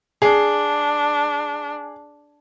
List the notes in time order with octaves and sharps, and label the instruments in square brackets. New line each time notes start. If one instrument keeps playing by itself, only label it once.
[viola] D4 [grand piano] G#4